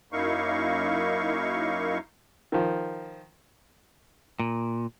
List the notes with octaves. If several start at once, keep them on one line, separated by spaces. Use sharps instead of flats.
F#2 A#3 D#4 E4 F5 C#6
D#3 F3
A#2